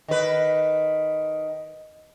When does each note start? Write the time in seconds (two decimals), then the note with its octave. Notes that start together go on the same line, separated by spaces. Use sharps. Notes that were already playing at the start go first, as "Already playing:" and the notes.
0.08 D#3 B4